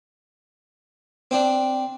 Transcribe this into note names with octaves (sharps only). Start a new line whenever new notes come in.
C4 D4